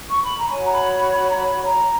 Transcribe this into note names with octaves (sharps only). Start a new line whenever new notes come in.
C#6
B5
A#5
F#4 C#5 G#5
A#5
B5
B5
B5
A#5
B5
A#5